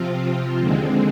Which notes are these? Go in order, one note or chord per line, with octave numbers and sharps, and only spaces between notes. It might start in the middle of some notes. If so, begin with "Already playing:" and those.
Already playing: C3 F3 C4 F4
D#2 D3 G#3 C4